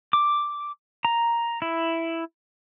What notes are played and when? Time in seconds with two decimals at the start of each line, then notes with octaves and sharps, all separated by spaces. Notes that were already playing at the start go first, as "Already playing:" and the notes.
0.13 D6
1.05 A#5
1.62 E4